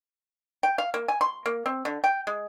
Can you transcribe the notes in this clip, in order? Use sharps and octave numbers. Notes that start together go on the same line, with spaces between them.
G5
F5
A#3
G#5
C6
A#3
C4
D3
G5
G#3